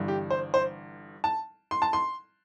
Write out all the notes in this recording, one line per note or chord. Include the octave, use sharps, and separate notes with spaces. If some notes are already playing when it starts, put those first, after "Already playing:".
Already playing: G1 G2 E3
G4
C5
C5
A5
C6
A5
C6